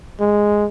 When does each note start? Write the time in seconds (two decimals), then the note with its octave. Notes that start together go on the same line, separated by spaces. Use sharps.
0.20 G#3